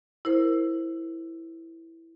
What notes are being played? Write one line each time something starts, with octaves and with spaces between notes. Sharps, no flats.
E4 A#4 C5